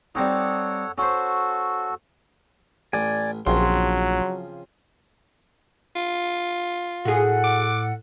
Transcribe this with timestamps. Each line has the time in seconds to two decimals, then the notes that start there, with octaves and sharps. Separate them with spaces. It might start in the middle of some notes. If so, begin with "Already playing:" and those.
0.15 G3 C4 D#4 A4 C#5 F#5
0.98 C#4 F#4 A4 C5
2.93 A1 D5 G#5
3.47 A#1 C#3 F3 F#3 C4 C6
5.96 F4
7.05 A2 F#4 G#4 A4 F#5
7.44 D6